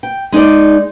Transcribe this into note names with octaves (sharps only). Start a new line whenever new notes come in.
G5
G#3 D#4 G#4 D5